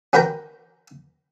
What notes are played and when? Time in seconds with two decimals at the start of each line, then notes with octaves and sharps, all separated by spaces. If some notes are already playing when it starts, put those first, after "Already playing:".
0.13 C#4 F#4 A#4 B4 G5 A#5